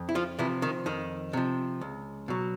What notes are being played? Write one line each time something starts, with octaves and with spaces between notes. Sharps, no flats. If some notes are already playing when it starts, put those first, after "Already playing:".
Already playing: F2
E4
F3 F4
C3 E3 F3 E4
D#3 D#4
F2 D#3 D#4
C3 F3
C#2
B2 F#3